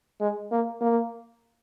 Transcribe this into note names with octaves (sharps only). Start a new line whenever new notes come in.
G#3
A#3
A#3